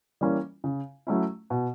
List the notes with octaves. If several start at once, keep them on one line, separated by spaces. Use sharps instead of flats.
E3 G3 A#3 C#4
C#3
F#3 A3 C#4 E4
B2